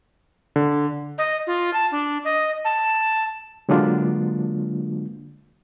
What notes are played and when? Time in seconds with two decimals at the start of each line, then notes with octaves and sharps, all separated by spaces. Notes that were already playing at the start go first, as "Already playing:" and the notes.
0.56 D3
1.18 D#5
1.47 F4
1.74 A5
1.92 D4
2.25 D#5
2.65 A5
3.69 D3 F#3 G#3 A#3 D4 F4